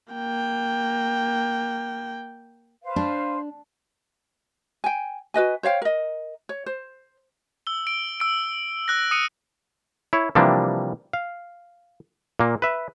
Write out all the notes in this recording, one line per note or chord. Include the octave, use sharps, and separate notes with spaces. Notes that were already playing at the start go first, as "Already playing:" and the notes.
A#3 G5
B4 C5 F5
D4
G5 G#5
F#4 B4 D#5 G#5
C5 C#5 F5 G5
A#4 D#5
C#5
C5
E6 G7
D7
E6 D7
E6 F#6 A#6
D#6 C#7 D#7
E4 C#5
C3 E3 F3 G3 A#3 D4
F5
A#2 A#3
B4 E5